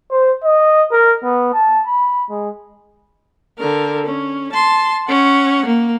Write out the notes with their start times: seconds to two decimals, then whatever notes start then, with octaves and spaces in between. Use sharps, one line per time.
0.11 C5
0.44 D#5
0.92 A#4
1.23 B3
1.53 A5
1.86 B5
2.30 G#3
3.58 D3 A#4
4.06 C#4
4.52 A5 C6
5.08 C#4 F#5
5.66 A#3